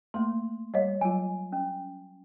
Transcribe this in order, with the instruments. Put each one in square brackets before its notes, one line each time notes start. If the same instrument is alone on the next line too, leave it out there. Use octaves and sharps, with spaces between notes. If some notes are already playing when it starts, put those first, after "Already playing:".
[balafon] A3 A#3 [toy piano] C6
[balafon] G3 C#5 [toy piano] D#5 F5
[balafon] F#3 F4 [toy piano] G#5
[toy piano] C#4